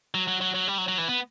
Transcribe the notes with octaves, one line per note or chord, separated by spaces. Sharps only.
F#3
F#3
F#3
F#3
G3
F#3
F#3
E3
B3